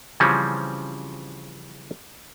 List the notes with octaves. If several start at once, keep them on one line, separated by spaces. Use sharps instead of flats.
C#3 E3 F3 G3 C4 C#4